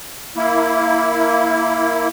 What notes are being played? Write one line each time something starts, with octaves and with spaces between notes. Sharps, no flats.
A#3 E4